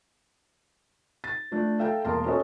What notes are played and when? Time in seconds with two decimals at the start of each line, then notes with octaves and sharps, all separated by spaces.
1.24 A6
1.51 F3 A3 D4
1.79 A4 E5 F5 G5 A#5
2.05 E1 A#3 A#4 A5 C6
2.25 C#4 F#4 A4 C5 C#5 D#5